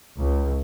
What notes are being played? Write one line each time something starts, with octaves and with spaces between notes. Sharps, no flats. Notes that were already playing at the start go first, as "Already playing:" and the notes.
C#2